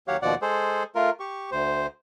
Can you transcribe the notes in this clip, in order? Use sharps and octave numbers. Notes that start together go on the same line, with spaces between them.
D#2 F#3 G4 C#5 F5 F#5
D#2 B2 F3 D5 F#5
G#3 G#4 A4 C5
A3 F4 A#4
G4 C#6
D2 C5